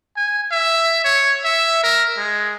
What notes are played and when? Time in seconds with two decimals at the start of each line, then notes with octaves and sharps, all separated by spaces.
0.17 G#5
0.51 E5
1.04 C#5
1.44 E5
1.84 A#4
2.18 G#3